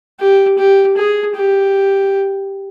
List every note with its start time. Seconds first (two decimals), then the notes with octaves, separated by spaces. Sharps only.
0.20 G4
0.58 G4
0.97 G#4
1.36 G4